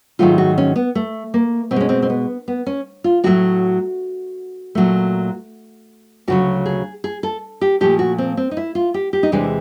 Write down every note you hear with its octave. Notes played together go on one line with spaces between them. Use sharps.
G#2 D#3 F#3 A3 F4
F#4
C#4
B3
A3
A#3
B2 C4
G#3 C#4
C4
C4
B3
B3
C#4
F4
A2 F#3 A3 F#4
A#2 F#3 A3
D2 C#3 F#3 F#4
G#4
G#4
A4
G4
A#2 F3 A3 G4
F#4
C4
C4
D#4
E4
F4
G4
G4
D#4
E2 C3 E3 G#3 D4